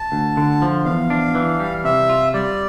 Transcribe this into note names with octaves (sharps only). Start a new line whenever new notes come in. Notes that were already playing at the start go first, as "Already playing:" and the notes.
Already playing: A5
D2
D3
F3
E2 F5
D4
E3
G3
C3 E5
F4
G3 D5